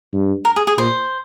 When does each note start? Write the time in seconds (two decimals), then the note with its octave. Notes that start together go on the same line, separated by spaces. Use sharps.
0.13 G2
0.45 A#4
0.56 G#4
0.67 G#4
0.78 A#2 C5